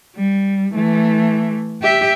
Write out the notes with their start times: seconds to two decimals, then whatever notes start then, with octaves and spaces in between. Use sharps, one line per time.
0.16 G3
0.74 E3 A3
1.83 G4 E5